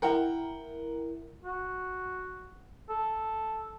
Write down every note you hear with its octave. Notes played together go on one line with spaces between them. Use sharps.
E4 A#4 F#5 G5
F#4
A4